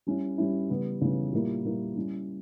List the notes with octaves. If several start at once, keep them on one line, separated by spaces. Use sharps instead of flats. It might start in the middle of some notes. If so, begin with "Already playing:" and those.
G3 C#4 E4
G3 C#4 E4
C#3 E3 G3 B3
C#3 E3 G3 B3
A#2 G3 A#3 E4
A#2 G3 A#3 E4
G3 C#4 E4